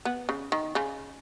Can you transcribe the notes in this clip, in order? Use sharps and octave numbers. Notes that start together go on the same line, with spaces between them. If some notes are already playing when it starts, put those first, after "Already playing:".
B3
C#3
D#3
C#3